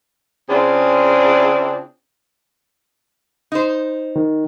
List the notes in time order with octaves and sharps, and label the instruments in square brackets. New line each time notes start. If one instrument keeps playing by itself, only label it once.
[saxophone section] C#3 C4 D4 E4 F4 G#4
[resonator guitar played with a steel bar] D#4 C5
[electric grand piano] D#3